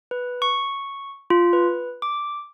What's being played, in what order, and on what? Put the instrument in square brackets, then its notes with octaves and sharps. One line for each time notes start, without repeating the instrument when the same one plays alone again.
[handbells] B4
C#6
F4
B4
D6